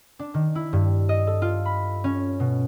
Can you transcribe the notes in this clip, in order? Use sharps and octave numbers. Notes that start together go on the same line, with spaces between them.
D4
D#3
E4
G2
D#5
A4
F4
B5
C#4
B2